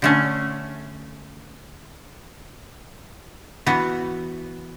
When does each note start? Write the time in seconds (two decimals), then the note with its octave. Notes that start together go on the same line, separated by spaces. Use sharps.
0.02 D3 A3 C#4
3.66 E3 B3 F#4